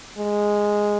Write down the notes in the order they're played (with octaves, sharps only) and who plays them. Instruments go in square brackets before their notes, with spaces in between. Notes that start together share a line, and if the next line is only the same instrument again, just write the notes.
[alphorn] G#3